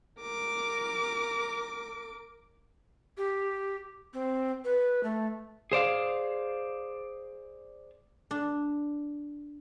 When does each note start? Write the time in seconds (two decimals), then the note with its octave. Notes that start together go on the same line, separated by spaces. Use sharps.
0.21 A#4 D6
3.18 G4
4.14 C4
4.65 B4
5.04 A3
5.72 G#4 C5 D5 F5
8.31 D4